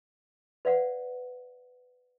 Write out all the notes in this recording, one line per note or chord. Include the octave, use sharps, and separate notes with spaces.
B4 D5 F5 F#5